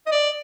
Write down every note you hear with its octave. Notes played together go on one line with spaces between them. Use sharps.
D#5
D5